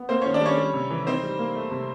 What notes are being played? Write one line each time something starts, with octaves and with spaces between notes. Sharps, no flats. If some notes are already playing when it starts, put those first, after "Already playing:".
Already playing: B3
A#3 C4 C5
D#3 C#4 C#5
D4 D5
G3 C#4 C#5
G3
C3
E3
C4 D#4 C5
G3
A#3
A3
C3